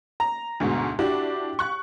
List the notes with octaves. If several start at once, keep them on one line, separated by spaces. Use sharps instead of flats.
A#5
D2 G#2 B2
D4 E4 F#4 G4
C#6 F#6